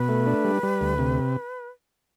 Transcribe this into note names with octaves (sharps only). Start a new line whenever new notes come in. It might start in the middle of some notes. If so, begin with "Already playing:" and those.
Already playing: B2 B4
A3
D4
G3
G3
D2
C3